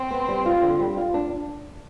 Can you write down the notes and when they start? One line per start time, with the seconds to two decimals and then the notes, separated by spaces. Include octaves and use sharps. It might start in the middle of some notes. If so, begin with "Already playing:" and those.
Already playing: C4
0.11 B3
0.28 G3
0.46 F4
0.63 D3
0.80 G3
0.97 F4
1.14 D4